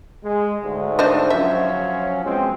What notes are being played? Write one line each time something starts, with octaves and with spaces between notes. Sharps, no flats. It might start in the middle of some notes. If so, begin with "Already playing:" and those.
G#3
D2 G#2
D4 C5 D#5
F3 F#3 C#4 E5
B2 G#3 C4